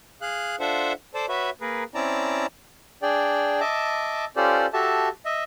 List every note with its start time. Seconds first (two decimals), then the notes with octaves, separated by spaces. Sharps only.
0.21 G#4 F5 F#6
0.60 D4 F4 A4 C5 E5 F#5
1.14 A4 C5 D5 A5
1.29 F#4 B4 C#5 E5
1.61 A#3 G#4 A#4 B4
1.95 C4 C#4 E4 D5 A5 A#5
3.02 D4 G#4 D5 G5
3.60 D#5 E5 A5 D6
4.36 C#4 F4 G4 A4 C5 D5
4.73 F#4 G4 A4 E5 A5
5.25 D#5 E5